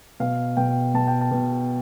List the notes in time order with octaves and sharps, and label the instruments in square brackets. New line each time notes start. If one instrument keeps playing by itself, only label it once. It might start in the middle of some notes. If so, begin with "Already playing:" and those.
[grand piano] B2 F5
B2 G5
B2 A5
G5
A5
B2